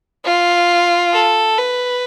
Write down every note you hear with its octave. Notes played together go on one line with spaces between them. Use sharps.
F4
A4
B4